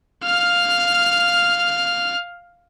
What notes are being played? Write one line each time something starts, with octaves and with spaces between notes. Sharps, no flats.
F5 F6